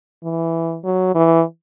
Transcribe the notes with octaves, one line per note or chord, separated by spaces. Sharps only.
E3
F#3
E3